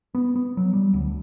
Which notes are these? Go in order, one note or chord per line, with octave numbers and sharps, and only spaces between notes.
B3
B3
F#3
G3
D2